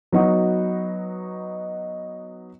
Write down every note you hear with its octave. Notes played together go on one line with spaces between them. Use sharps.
F#3 B3 D#4 F#4